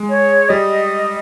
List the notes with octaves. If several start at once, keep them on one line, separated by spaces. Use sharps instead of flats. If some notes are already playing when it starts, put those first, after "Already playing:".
Already playing: G#3
C#5
G3 D#5